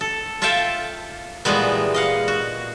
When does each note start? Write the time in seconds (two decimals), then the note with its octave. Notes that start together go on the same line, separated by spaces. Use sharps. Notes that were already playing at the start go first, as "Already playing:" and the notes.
0.01 A4
0.42 F4 A4 E5 F5 G5 A5
1.45 A#2 E3 G3 G#3 B3
1.94 D#5 F5 F#5
2.28 F#4